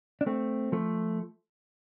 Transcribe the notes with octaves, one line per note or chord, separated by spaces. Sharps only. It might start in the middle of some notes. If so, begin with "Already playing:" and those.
D4
A3 C4
F3 A3